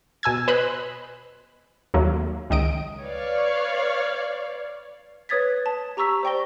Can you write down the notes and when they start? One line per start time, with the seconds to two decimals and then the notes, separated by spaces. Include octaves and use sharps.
0.23 B2 G#5 E6 G#6
0.48 B4 C5 D#5 B5 F#6
1.94 D#2 F#3 A3 A#3
2.50 C#2 D#3 D#5 D7
3.01 B4 C#5 D5 F5
5.29 B4 C#5 D#6 G#6 A6 B6
5.66 A5
5.97 G4 A#5 C#6 E6 B6
6.23 C5 D5 G5 C#6 A#6 G7